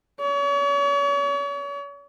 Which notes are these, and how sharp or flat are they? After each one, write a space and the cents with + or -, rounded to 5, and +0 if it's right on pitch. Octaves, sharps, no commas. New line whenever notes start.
C#5 +40